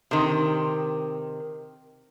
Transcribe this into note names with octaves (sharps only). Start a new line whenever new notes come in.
C3 D#3